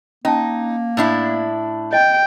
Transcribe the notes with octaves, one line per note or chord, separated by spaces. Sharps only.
A#3 C#4 D#4 A5
A2 D4 E4
D#5 G5